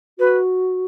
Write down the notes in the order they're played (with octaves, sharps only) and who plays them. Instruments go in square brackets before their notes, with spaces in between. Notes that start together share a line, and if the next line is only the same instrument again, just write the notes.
[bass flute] F#4 [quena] B4